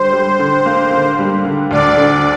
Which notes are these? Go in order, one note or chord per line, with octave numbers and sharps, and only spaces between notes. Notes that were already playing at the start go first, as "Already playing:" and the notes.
Already playing: D3 G3 C5
G3
D3
A#3
D3
G3
D3
D2 D5
D3